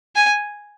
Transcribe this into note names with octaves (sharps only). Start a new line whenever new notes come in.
G#5